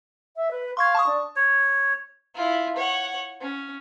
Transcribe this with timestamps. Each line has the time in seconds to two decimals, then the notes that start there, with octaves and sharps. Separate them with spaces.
0.36 E5
0.51 B4
0.77 F5 C6 C#6 G#6
0.95 A5 C#6 D#6
1.06 D4
1.36 C#5
2.35 E4 F4
2.76 C#5 F#5
3.41 C#4